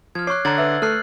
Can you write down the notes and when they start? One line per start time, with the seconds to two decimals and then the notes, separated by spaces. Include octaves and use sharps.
0.15 F3 F6 G#6
0.27 C#5 C#6 D6 F#6 C7
0.45 D3 C#5 A#5 G#6 A6 F#7
0.58 B4 E5 E6
0.82 A3 A4 A5 F6 F#6 C7